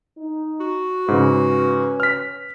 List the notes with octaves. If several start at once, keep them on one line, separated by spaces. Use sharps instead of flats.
D#4
F#4
G#2 C#3 C#4 B4
F6 B6